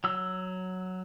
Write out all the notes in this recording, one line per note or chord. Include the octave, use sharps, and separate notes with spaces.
F#3 E6